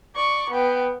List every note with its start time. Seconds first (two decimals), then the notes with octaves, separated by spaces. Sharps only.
0.16 D5 C#6
0.51 B3 G5